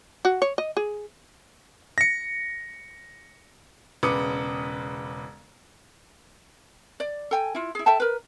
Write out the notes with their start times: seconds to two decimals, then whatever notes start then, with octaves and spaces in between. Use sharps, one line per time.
0.25 F#4
0.42 C#5
0.58 D#5
0.77 G#4
1.98 A#6 C#7
4.03 E1 C#3 B4 D6 D#6 C#7
7.00 D5
7.31 A4 G5 G#5
7.55 E4 F4
7.75 E4 G#4
7.86 A4 E5 G5 A5
8.00 A#4 B4